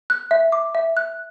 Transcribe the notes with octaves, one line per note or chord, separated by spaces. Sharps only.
F#6
E5
D6
E5
F#6